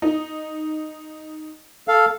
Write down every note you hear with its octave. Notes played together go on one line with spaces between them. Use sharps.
D#4
A4 F5